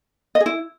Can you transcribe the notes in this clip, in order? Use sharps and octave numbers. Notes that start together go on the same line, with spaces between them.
D#5
G#4
E4